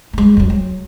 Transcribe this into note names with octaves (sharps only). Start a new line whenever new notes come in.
G3 G#3
F2 F#3
F#3